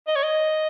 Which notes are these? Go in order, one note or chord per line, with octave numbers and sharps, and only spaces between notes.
D#5
C#5
D#5